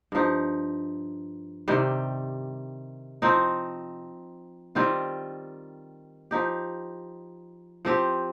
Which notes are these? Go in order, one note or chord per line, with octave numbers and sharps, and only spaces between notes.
G2 F3 D#4
C3 D#3 G3
F3 C4 D#4
D#3 G3 C4 F4
F3 D#4 G4
F3 C4 G4